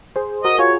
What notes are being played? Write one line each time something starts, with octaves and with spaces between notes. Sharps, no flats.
G#4 C5
F#4 A#4 D#5
F4 G#4 C#5